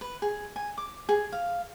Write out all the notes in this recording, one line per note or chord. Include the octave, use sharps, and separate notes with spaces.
B4
G#4
G#5
D6
G#4
F5